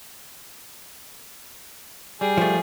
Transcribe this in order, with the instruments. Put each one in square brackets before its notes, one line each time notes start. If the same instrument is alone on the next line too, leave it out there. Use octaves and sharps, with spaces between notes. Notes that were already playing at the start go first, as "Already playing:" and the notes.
[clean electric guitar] G3 [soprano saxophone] G#4
[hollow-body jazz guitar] F3 A3